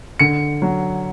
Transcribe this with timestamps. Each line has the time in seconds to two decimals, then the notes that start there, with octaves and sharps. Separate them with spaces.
0.19 D3 C#7
0.62 F#3